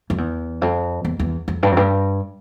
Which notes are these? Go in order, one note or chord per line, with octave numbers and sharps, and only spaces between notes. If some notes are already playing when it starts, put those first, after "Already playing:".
F2
E2
F2
E2
E2
F2
G2
F2
G2